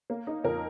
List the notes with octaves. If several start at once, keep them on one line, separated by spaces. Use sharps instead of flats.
A#3
D#4
F2 A#4